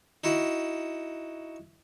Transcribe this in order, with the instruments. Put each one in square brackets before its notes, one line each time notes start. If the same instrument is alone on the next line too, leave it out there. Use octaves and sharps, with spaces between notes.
[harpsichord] D#4 E4 F#4